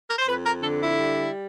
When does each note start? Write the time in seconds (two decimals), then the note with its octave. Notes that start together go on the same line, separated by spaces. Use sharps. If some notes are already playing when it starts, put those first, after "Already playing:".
0.09 A#4
0.18 C5
0.27 F2 B4
0.45 A#4
0.62 D3 A4
0.81 E4
0.98 G3